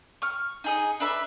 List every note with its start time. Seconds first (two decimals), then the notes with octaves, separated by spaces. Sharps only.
0.22 C#6 F6
0.64 D#4 G#4 D#5
1.00 D4 B4 E5 B5